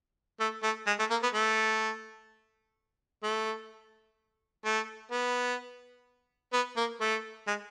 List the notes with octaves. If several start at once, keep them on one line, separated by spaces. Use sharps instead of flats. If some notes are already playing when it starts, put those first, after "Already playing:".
A3
A3
G#3
A3
A#3
B3
A3
A3
A3
B3
B3
A#3
A3
G#3